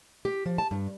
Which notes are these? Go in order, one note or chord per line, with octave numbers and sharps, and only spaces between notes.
G4
F3
A5
G2